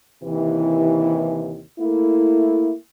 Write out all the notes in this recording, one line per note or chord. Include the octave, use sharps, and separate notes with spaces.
D#2 C3 E3
A3 A#3 E4